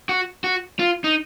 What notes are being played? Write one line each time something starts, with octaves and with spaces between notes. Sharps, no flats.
F#4
F#4
F4
D#4